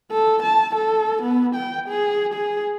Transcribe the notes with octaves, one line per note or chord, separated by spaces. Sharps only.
A4
A5
A4
B3
G5
G#4
G#4